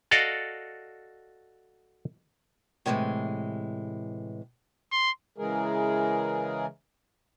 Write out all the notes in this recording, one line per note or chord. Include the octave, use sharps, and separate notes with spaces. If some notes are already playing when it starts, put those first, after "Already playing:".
F#4 A4 D5 D#5 F5 F#5
A2 C3 E3 G3 G#3
C6
C#3 E3 G#3 G#4 A#4